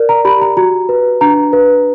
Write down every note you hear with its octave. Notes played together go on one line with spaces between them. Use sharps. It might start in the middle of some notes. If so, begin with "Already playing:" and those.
Already playing: A#4 D5
A#5
G4 B5
A#5
F#4 A#5
B4
D4 A#5
B4